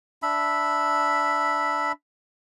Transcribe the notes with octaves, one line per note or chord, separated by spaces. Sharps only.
D4 E5 B5